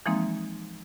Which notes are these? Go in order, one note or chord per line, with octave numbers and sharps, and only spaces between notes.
E3 F3 G#3 A#3 C4 D#4